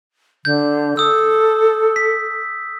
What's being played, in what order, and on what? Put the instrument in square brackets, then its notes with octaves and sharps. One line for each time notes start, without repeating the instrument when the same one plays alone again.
[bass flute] D3 [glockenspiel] G6
[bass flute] A4 [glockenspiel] D#6 E6
[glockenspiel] B6